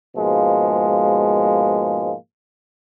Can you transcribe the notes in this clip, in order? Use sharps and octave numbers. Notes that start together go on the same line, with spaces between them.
G#2 B2 F3 G#3 A#3